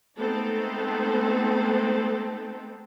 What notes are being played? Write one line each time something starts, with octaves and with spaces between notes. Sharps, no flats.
G#3 A3 B3 C4 D#4 A4